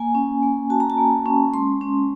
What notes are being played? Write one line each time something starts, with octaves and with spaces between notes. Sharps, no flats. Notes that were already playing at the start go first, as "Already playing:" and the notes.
Already playing: A#3 G#5
C#4
A#3
F#4 A5
A#5
A5
A#3
C#4
G#3 C6
C#4